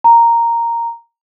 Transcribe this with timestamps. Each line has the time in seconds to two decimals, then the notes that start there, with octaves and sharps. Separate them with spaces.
0.04 A#5